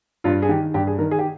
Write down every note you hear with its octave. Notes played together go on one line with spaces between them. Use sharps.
G2 F4
G#4
D#3 G4
G2 G4
G#4
D#3 A#4
G#4
G4